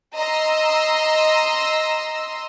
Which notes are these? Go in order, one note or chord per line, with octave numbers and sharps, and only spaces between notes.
D#5 A#5 C6 E6